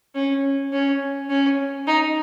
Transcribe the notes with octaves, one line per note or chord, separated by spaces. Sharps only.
C#4
C#4
C#4
D#4